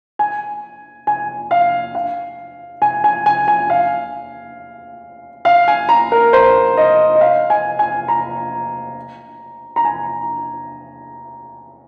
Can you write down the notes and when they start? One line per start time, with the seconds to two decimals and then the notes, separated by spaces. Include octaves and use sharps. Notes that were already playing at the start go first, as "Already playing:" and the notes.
0.19 G#5
1.07 G#5
1.51 F5
1.95 F5
2.82 G#5
3.04 G#5
3.26 G#5
3.48 G#5
3.70 F5
5.45 F5
5.68 G#5
5.89 A#5
6.12 A#4
6.33 C5
6.77 D#5
7.16 D#5
7.21 F5
7.50 G#5
7.79 G#5
8.08 A#5
9.76 A#5
9.85 G#5